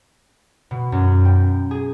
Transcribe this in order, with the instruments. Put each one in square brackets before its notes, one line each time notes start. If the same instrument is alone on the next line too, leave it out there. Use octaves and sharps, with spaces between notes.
[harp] B2
F#2
G5
G#4